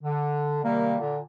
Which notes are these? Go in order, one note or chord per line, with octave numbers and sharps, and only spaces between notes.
D3
C3 D#3 G3 A#3
A#2 D3